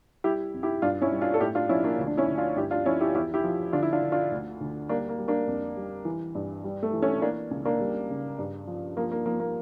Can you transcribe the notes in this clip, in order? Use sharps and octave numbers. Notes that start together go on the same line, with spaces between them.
G3 E4 G4
F2
E4 G4
G2 D4 F4
C#4 E4
G3
D4 F4
A4
A2 E4 G4
D4 F4
F3 C#4 E4
A#3 D4
D2
D4
C#4 E4
D2
D4 F4
G2 E4 G4
D4 F4
F3 C#4 E4
E4 G4
E2 E4 G4
E4 G4
F3
D3 D4 F4
E4
D4 F4
D3
D4 F4
D2
D2
G3 A#3 D4
A#3
G3
A#3 D4
F2
G3
E3
G2
G3
A3
E3
A3 C#4
E3 A#3 D4
C#2
A#3 D4
G3
C#3
G2
F3
F3 A#3
A#3
F3 A#3
A#3